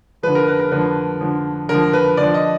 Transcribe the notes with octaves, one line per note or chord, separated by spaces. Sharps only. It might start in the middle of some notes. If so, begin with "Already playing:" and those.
D3 F3 B4
A#4
B4
A#4
D3 F3 B4
D3 F3
D3 F3 A#4
B4
D3 F3 D5
D#5